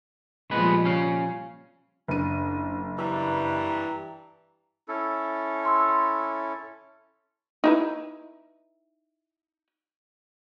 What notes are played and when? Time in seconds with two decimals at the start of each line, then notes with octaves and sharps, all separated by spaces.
0.51 A#2 F3 G3 G#3 B3 B4
0.85 C#4 F5
2.08 F#1 D4 D#7
2.98 G2 E3 G3 A#5
4.88 C#4 E4 A4
5.65 C6 E6
5.89 C6
7.64 D#4 E4 B4